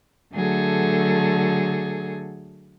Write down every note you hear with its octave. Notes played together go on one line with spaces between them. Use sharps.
D3 F#3 A3 G#4 A4